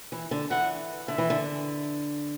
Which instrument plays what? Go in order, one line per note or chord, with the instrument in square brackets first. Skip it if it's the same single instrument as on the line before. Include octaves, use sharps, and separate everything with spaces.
[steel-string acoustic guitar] E3
D3
[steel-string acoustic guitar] E3 [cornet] F#5
[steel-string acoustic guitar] D3 [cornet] E5
[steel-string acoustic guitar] E3
D3